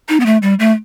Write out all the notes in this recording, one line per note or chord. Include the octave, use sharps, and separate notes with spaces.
D#4
B3
A3
G3
A3